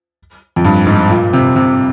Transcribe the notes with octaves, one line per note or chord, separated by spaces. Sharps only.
F2
G2
G#2
A#2
C3
C3